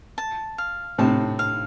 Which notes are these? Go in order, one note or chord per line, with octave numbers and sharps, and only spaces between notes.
A5
F5
A2 C3 A5
F5